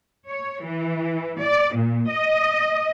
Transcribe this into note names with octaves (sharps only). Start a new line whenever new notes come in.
C#5
E3
D5
A#2
D#5